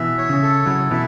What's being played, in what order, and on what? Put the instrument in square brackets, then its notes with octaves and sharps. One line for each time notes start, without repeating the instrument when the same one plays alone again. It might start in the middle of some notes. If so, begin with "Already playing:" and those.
Already playing: [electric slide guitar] B2 E3 [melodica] E5
[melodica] C#5
[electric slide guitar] C#3
[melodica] A4
[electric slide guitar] C#3 F#3 [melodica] E4
[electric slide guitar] B2 E3 [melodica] E5